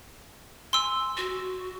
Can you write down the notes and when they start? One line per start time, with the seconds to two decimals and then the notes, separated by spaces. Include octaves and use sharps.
0.73 G#5 C6 E6
1.17 F#4